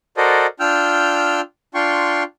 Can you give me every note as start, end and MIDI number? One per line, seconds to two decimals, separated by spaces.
0.17 0.46 66
0.17 0.46 69
0.17 0.46 70
0.17 0.46 72
0.17 0.46 74
0.17 0.46 75
0.60 1.41 62
0.60 1.41 65
0.60 1.41 79
0.60 1.41 88
0.60 1.41 89
0.60 1.41 91
1.75 2.23 62
1.75 2.23 65
1.75 2.23 79
1.75 2.23 84
1.75 2.23 85